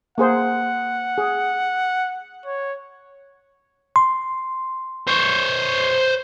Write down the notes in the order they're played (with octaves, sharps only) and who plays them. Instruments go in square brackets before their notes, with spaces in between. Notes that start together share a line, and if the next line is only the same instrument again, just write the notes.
[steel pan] A#3 G#4 C5 [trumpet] F#5
[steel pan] G#4
[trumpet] C#5
[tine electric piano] C6
[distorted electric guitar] C5 C#5